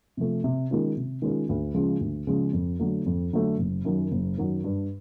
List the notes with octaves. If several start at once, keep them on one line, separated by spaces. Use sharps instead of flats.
C3 F3 A3
C3
D#3 G#3 C#4 F4
C3
D#3 G#3 C#4 F4
D2
C#3 F3 G#3
D2
C#3 F3 G#3
F2
D3 F#3 A3
F2
D3 F#3 A3
F#1
F#2 D#3 F#3
F#1
F#2 D#3 F#3
G2